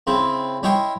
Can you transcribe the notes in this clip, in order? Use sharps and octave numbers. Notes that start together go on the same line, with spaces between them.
C#3 C4 E4
C#4 E4 C#5 D#5 G5 C6